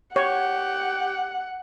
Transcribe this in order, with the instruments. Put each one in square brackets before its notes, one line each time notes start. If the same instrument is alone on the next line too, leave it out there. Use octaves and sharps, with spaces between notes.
[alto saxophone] G4 [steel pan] C#5 [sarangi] F#5